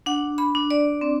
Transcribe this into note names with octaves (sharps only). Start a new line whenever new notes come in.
D4 F#5
B5
D4
D5
C4